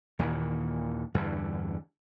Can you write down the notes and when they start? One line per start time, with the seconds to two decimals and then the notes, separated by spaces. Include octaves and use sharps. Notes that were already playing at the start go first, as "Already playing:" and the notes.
0.19 D#2 A#2 D#3 E3
1.14 E2 G2 D3